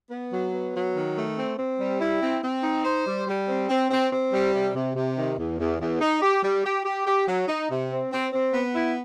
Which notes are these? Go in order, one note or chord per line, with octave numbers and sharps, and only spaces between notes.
B3
F#3
B3
F#3
D#3
A3
C4
C4
G3
E4
C4
C4
D#4
C5
G3
G3
C4
C4
C4
C4
G3
C3
C3
C3
D#3
E2
E2
E2
D#4
G4
G3
G4
G4
G4
F#3
D#4
C3
C4
C4
C4
B3
E4